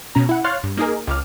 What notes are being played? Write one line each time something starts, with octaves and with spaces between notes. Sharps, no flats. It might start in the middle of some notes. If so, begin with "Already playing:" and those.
B2 C#4 A#5
E4 F#5
C#5 F5 C6 F6 F#6 A6
G2
A#3 D#4 G#4 A#4
C#2 D6 F6